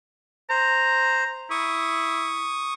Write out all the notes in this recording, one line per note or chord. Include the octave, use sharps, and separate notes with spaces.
C5 A#5
E4 C#6 D#6